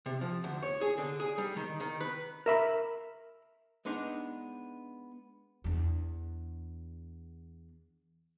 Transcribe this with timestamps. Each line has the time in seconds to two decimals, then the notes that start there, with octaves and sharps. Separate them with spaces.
0.06 C3
0.21 F3
0.44 D2
0.63 C#5
0.81 G#4
0.98 D3
1.20 G#4
1.38 G3
1.57 D#3
1.80 D#3
2.01 B4
2.46 A#4 E5 B5
3.85 G#3 B3 D4 D#4
5.64 E2 D4